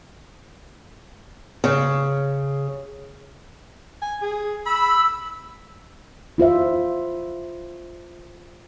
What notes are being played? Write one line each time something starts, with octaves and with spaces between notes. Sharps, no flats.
C#3
G#5
G#4
B5 E6
E4 F4 C5 E5